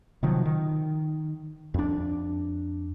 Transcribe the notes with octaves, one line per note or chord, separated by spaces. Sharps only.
C3 D#3 F3 F#3
D#3
F2 D4